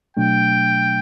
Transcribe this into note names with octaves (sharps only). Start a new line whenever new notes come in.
B2 F#3 A3 D4 G5